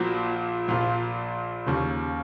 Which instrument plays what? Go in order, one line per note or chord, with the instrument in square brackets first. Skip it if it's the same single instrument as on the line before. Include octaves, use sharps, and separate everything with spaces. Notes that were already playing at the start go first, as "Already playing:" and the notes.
Already playing: [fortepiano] A#1 A#2 F3 F#4
A#1 A#2 F3 F4
D#2 C#3 F3